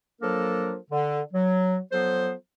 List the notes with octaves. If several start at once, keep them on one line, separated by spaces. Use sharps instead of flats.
F3 F#3 A#3 D4 A4 A#4
D3
F#3
F3 F#3 B3 A4 C5